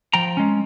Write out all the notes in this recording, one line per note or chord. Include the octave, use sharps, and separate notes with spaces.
F3 G5 A#5
G#3 C#4